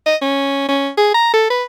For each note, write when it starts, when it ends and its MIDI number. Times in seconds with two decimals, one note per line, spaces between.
0.06 0.16 75
0.22 0.65 61
0.69 0.90 61
0.98 1.11 68
1.14 1.29 82
1.34 1.46 69
1.50 1.64 71